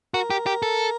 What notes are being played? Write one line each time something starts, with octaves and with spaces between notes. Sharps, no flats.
F#4 A#4
G4
G4
A4